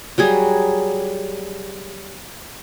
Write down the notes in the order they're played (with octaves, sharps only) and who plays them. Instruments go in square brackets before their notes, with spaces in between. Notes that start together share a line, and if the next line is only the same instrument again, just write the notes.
[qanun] F#3 G3 G#4